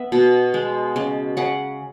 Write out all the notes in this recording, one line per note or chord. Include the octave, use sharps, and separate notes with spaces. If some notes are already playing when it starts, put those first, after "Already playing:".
Already playing: B3 B4 E5
B2
G#3
C#3
C#3 F#5